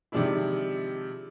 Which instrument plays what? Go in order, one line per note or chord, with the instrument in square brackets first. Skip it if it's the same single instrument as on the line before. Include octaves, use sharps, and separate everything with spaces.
[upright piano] C3 D#3 F3 G#3 D4 E4